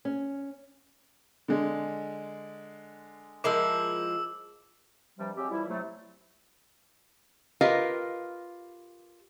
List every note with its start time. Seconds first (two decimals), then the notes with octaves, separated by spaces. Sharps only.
0.05 C#4
1.48 D3 G#3
3.44 F3 G#3 E4 A#4 D6 E6
5.18 G2 C3 F3 G3
5.36 F#3 G#3 C4 G4
5.50 E3 F3 G3 E4
5.68 C3 F#3 A3
7.61 F4 G4 A#4 B4 D#5 F5